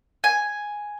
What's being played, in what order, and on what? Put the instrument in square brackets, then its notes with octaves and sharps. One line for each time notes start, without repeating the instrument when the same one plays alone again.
[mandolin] G#5